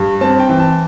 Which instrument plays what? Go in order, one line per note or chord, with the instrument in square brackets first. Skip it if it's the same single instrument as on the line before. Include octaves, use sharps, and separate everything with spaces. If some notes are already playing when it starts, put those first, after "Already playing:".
Already playing: [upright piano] G2
C4 A5
G5
E3
A5